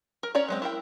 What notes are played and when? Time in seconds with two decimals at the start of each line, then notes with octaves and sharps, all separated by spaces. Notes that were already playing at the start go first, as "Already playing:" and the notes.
0.23 A#4
0.35 C#4 C#5 D5 A#5
0.48 F#3 G#3 C4
0.62 E4 A#4 G5